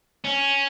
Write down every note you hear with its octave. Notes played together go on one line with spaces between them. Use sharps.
C#4